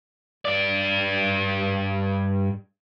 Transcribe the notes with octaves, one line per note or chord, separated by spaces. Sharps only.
G2 D5